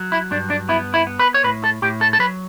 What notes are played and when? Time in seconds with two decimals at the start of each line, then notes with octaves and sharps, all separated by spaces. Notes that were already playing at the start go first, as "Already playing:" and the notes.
Already playing: F#3
0.12 E4
0.31 G2 D4
0.50 D4
0.69 B3 E4
0.94 E4
1.07 B3
1.19 B4
1.34 C#5
1.44 A2 B4
1.64 A4
1.82 A2 G4
2.01 A4
2.13 A4
2.19 F#3 B4